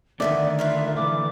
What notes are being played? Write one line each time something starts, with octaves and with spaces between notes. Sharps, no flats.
A#2 D3 D#3 A3 B3 D5 E5
F4 A#4 B4 E5
E3 D6